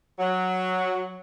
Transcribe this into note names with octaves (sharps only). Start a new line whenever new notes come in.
F#3